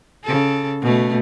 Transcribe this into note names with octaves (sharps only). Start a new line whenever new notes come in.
C#3 A4
B2 A3